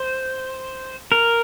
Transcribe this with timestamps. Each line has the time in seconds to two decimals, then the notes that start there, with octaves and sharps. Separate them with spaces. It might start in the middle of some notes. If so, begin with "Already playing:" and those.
Already playing: C5
1.12 A#4